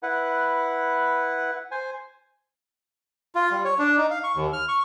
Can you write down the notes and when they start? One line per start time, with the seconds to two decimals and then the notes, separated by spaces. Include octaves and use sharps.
0.03 E4 B4 F#5
1.71 C5 G#5
3.35 F4
3.51 G3
3.65 C#5
3.79 D4
3.98 D#4
4.10 F5
4.24 C#6
4.35 D#2
4.53 F6
4.68 C#6